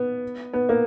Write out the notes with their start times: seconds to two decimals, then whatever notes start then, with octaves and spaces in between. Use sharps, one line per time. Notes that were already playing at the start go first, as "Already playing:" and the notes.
Already playing: B3
0.53 B3
0.69 A#3